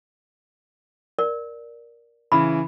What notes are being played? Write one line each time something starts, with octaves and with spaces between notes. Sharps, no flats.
A#4 D5
C#3 E3 B5